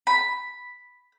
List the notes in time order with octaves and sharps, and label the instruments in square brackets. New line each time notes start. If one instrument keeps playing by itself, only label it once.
[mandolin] B5